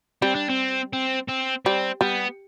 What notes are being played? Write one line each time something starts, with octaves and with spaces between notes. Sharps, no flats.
G3 C4
D4
C4
C4
C4
G3 C4
G3 B3